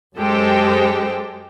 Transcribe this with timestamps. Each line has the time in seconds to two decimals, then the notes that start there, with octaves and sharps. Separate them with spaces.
0.16 F#2 G#3 G4 A4 C5 G5